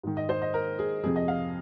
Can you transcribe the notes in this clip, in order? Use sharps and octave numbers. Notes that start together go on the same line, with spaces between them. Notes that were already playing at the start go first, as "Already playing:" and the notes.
G#2 D#3
D#5
C5
D#5
A#4
G#4
F2 C3 F3 G#4
D#5
F5